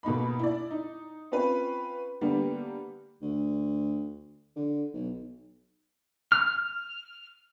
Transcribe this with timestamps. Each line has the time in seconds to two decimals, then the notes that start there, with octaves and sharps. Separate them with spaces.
0.03 B2 A#3 D#4 B5
0.39 E4 D5
0.71 D#4
1.32 C4 C#4 F4 B4
2.21 D3 G3 A#3 B3
3.21 D2
4.56 D3
4.93 B1
6.32 F6